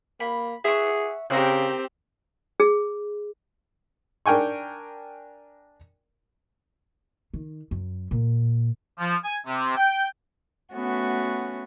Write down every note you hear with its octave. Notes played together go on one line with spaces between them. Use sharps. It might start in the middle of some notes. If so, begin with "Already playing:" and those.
A#3 B5
G#4 E5 F#5 C#6
C#3 C4 G4 A#4 F#6
G#4
D4 A#4 G5 G#5 C#6
D#3
F#2
A#2
F3
G#5
C3
G5
A3 B3 C#4 F#4